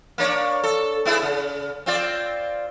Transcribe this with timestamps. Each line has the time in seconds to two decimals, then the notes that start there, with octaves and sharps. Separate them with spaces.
0.18 A#3 D4 C#5
0.63 A4
1.05 B3 E4 G#4
1.22 C#3
1.86 C4 F4 D5